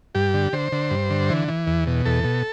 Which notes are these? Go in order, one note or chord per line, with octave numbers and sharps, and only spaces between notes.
G2 G4
D3
D3 C5
D3
G2
D3
E3
E3
E2
B2
E2 A4
B2